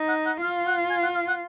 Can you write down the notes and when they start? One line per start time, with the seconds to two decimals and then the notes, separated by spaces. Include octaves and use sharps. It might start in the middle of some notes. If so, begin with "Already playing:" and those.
Already playing: D#4
0.09 F#5
0.26 F#5
0.42 F4 F5
0.67 F#5
0.90 G#5
1.03 F#5
1.15 F5
1.28 F#5